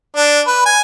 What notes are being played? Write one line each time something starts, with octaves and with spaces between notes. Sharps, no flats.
D4
B4
G#5